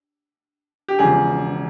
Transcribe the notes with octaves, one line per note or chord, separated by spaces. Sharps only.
G4
E1 E2 C#3 F3 G#4